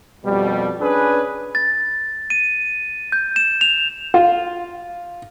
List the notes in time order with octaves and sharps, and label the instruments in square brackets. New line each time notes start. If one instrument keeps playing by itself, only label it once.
[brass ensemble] F2 B2 G3
C#4 D4 G#4 B4
[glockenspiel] A6
D#7
G6
E7
F7
[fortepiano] F4